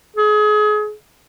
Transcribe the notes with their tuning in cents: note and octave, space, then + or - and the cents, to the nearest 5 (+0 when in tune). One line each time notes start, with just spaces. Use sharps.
G#4 +30